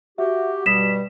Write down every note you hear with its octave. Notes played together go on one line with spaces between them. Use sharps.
F#4 G4 E5
G2 B2 G3 D#6 B6 E7